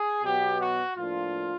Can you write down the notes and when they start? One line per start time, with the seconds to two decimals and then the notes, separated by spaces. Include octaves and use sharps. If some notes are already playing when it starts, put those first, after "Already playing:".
Already playing: G#4
0.24 B2 F#3 B3 G4
0.60 F#4
0.95 A2 F3 A#3 D4 F4